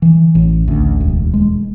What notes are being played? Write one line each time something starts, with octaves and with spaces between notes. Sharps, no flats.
E3
A1
D2
E1
G#3